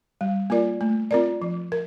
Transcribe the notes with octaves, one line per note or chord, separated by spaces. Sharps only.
G3
A#3 F4 A#4 D5
A3
C4 F4 A#4 D5
F3
A#4